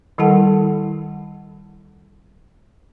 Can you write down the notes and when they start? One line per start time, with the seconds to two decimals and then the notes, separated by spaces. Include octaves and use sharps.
0.18 D#3 G3 E4 A4 F#5 A5